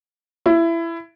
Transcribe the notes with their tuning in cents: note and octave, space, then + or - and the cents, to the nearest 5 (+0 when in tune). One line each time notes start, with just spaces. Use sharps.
E4 +20